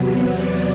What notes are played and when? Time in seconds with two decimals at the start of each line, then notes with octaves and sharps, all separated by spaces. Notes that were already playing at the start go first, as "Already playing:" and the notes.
Already playing: E2 C3 F#3 B3
0.29 D5